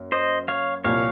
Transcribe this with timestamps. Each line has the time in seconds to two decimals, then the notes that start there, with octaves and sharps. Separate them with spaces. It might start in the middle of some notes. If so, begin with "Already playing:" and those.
Already playing: F#2 A#3
0.12 C5 D#5
0.48 C#5 F5
0.84 C2 A#2 F3 C#5 F5